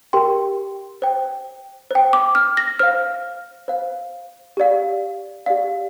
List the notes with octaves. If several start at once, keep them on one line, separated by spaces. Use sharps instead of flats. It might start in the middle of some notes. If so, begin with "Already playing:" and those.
G4 A#4 G5 C6
C5 G5
C5 G5
D6
F6
A#6
C5 F5 F6
C5 F5
G4 D5 F5
G4 D5 F5